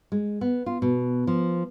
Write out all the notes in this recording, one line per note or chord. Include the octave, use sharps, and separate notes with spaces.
G#3
B3
F4
B2
F3